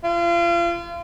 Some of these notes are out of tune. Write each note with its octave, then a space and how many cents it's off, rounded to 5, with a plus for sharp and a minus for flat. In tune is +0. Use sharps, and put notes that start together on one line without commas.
F4 -35